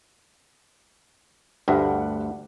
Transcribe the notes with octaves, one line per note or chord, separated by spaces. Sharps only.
D2 G2 A3 G4 F#5